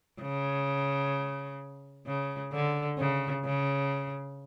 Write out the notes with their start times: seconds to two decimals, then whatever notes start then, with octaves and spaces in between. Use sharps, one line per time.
0.22 C#3
2.07 C#3
2.52 D3
2.98 C#3
3.45 C#3